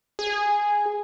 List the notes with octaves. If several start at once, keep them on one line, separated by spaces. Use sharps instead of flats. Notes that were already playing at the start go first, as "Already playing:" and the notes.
G#4